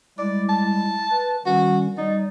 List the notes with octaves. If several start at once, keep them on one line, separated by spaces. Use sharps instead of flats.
G3 G#3 E4 D5
A5
B4
D#3 G3 C#4 F#4
G3 D#4 D5